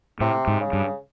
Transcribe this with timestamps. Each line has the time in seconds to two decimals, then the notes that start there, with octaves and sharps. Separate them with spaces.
0.20 A2 C3
0.47 G#2
0.60 C#3
0.73 G2